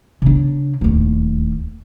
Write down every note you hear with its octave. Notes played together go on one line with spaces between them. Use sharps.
C#3 D4
D1 D#2